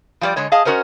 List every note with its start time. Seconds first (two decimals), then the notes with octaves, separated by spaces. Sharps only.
0.21 F3 G3 D5
0.36 D3 G#3 C#5 D#5
0.52 G#4 D#5 F5 A5
0.65 C#4 F#4 A#4 C5 D#5